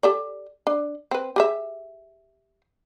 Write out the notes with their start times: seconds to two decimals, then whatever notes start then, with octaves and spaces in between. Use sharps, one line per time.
0.03 G4 A4 D5
0.67 D4
1.11 C4 B4
1.36 G4 G#4 E5